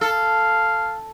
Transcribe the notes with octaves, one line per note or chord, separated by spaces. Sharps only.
A4 F5